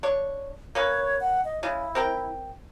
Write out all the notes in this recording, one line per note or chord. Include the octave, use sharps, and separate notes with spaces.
D4 C#5
A#3 C#4 B4 C#5
F#5
D#5
C#3 G#3 E4
C4 A#4 G5